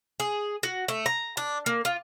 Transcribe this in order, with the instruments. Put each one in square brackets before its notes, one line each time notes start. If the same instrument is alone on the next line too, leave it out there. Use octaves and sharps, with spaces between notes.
[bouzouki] G#4
F#4
A3
A#5
D4
A#3
F4